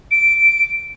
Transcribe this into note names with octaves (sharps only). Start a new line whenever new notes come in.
D7